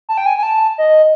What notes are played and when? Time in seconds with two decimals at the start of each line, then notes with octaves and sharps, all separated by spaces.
0.09 A5
0.17 G5
0.26 G#5
0.38 G#5
0.43 A5
0.78 D#5